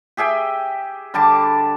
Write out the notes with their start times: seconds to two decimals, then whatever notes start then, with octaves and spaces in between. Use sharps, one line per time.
0.17 G4 G#4 E5 G5
1.14 D3 G3 A5 D6